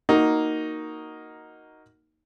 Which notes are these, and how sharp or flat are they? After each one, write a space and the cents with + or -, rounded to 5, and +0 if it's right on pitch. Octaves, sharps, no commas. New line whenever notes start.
A#3 +0 D#4 +5 F#4 +0